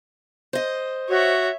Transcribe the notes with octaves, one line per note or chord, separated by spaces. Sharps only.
C5 D#5
F#4 C#5 E5